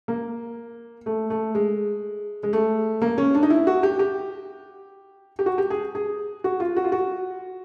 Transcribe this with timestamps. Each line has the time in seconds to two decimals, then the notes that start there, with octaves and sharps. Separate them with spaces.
0.08 A#3
1.06 A3
1.30 A3
1.55 G#3
2.43 G#3
2.53 A3
3.02 A#3
3.18 C#4
3.35 D4
3.43 D#4
3.50 E4
3.67 F#4
3.83 G4
3.99 G4
5.39 G4
5.46 F#4
5.58 G4
5.70 G#4
5.95 G#4
6.44 F#4
6.60 F4
6.76 F#4
6.84 F4
6.92 F#4